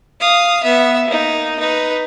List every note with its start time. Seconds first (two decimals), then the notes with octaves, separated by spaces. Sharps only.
0.20 F5 D#6
0.63 B3 E5
1.08 A#3 D#4
1.60 D#4 B4